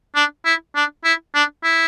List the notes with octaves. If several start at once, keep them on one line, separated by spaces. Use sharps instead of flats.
D4
E4
D4
E4
D4
E4